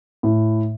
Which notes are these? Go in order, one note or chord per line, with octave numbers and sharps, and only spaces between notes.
A2